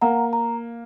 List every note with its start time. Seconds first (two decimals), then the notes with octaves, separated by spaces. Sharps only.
0.01 A#3 F#5 A#5
0.33 A#5